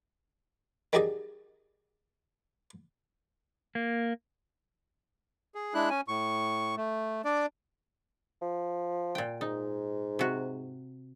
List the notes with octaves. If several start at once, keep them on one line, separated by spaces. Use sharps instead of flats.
D#3 F#3 G3 G#4 D5 D#5
A#3
G#4
G#3 D4 E4 F#6
C#4 G#5
A2 C#6
A3
D4 D5
F3
A#2 G5
G#2 D#4
C3 F#4